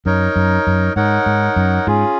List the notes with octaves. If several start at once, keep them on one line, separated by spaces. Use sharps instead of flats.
F#2 D#4 A#4 C#5
F#2
F#2
G#2 D#4 A#4 C#5 F#5
G#2
F#2
G#2 C#4 F4 G#4